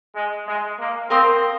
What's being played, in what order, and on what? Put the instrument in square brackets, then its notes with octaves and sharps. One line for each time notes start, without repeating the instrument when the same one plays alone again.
[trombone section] G#3
G#3
A#3
[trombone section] C4 [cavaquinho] A#4 F5 C6 D#6